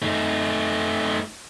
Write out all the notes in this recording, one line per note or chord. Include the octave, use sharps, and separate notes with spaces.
A3 D#4